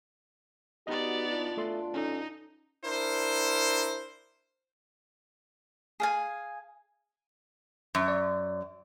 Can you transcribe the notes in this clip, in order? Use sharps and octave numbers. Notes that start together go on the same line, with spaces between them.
B3 D#4 F#4 G4 D5 D#5
B2 D4 F4
A3 A4 C6
C#4 D#4 A4
D4 E4 A#4 C5
G#4 F5 G#5
F#2
D5